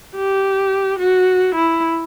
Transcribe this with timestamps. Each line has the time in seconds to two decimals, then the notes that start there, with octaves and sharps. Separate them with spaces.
0.15 G4
0.99 F#4
1.55 E4